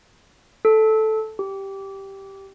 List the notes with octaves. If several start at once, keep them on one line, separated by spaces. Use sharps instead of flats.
A4
G4